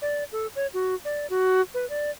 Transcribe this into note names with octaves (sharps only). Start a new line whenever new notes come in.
D5
A4
C#5
F#4
D5
F#4
B4
D5